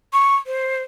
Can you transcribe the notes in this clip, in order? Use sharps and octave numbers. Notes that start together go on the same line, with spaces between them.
C#6
C5